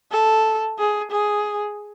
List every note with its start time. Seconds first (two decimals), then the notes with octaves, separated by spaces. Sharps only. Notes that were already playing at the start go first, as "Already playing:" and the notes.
0.11 A4
0.78 G#4
1.11 G#4